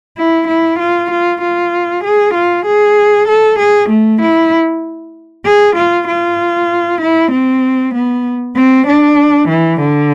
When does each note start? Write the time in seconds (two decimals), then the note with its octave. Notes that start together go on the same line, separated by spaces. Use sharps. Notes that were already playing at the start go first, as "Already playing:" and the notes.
0.17 E4
0.48 E4
0.79 F4
1.11 F4
1.41 F4
2.04 G#4
2.34 F4
2.66 G#4
3.28 A4
3.59 G#4
3.89 A3
4.21 E4
5.45 G#4
5.76 F4
6.07 F4
7.01 E4
7.32 C4
7.94 B3
8.56 C4
8.87 D4
9.49 E3
9.80 D3